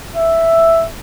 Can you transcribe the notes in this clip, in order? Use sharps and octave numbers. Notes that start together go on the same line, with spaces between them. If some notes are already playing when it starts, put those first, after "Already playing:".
E5